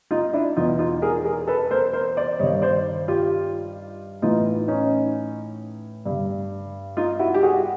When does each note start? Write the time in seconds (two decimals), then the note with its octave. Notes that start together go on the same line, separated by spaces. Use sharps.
0.11 D#4 F4
0.33 D4 E4
0.57 E2 B2 D#4 F4
0.79 D#4 F4
1.02 G#4 A#4
1.25 G#4 A#4
1.47 A4 B4
1.71 A#4 C5
1.93 A#4 C5
2.17 C5 D5
2.39 G2 C#5 D#5
2.43 D#3
2.62 C5 D5
3.08 F4 G4
4.22 A2 E3 D#4 F4
4.68 C#4 D#4
6.06 G2 D3
6.97 D#4 F4
7.19 E4 F#4
7.34 G4
7.43 F#4 G#4